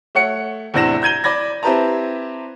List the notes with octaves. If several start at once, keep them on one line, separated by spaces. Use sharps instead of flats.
A3 C#5 F#5 C#7
E2 A2 C3 D4 A#6 E7
A#5 G6 G#6 D#7 G7
D5 B5 G#6 A#6
C4 E4 G4 B4 A5 A#5